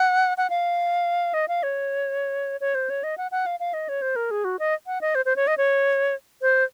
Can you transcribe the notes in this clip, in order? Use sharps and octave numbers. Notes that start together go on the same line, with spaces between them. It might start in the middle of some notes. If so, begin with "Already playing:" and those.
Already playing: F#5
F#5
F5
D#5
F5
C#5
C#5
C5
C#5
D#5
F#5
F#5
F5
F5
D#5
C#5
C5
A#4
G#4
F#4
D#5
F#5
D#5
C5
C5
C#5
D#5
C#5
C5